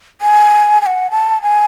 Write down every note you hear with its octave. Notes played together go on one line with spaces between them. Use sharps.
G#5
G#5
F#5
A5
G#5